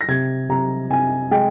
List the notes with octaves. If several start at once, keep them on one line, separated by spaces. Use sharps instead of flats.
A#6
C3 G#6
C3 A#5
C3 G#5
G#3 G5